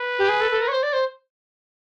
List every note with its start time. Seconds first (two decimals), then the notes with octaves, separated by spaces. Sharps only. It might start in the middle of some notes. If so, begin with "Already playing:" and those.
Already playing: B4
0.19 G4
0.29 G#4
0.41 A4
0.51 A4
0.62 A#4
0.68 C#5
0.73 C5
0.83 D5
0.93 C5